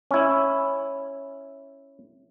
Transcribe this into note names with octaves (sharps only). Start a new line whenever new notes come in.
C#4 E4